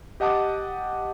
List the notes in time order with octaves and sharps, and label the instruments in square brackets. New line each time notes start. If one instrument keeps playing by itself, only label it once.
[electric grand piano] G4 D#5 F#5 A5 D6 D#6